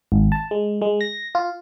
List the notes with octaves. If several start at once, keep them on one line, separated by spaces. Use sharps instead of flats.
G#1
A5
G#3
G#3
A#6
F4